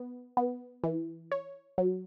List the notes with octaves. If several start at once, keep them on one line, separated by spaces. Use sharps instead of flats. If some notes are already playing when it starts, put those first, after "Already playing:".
Already playing: B3
B3
E3
C#5
F#3